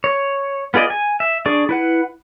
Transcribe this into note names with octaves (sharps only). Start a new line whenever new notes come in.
C#5
B3 F4 G#4 D5 D#5
G#5
E5
D4 G#4 D5 C#6
E4 B4 F#5